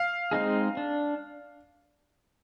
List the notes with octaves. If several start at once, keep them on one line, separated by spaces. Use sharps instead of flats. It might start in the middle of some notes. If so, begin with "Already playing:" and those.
Already playing: F5
G#3 C4 D#4 G#4
D4